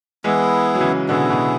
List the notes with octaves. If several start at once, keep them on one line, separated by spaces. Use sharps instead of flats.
E3 G#3 B3 E4 G#4
F#3
C#3 E3
B2 D3 B3 E4 G#4
B2